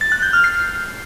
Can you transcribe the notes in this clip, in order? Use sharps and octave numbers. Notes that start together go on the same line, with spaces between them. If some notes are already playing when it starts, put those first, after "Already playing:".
A6
F#6
G6
F6
C7